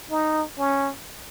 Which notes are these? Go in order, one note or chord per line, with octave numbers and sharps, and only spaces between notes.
D#4
C#4